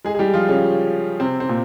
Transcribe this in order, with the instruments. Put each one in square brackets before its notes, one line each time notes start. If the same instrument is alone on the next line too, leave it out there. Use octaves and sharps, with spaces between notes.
[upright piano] G#3 G#4
G#4
G3 G4
F3 F4
C#3 C#4
C3 C4
C4
A#2